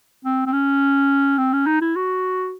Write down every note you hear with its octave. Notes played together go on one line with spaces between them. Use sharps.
C4
C4
C#4
C4
C#4
D#4
E4
F#4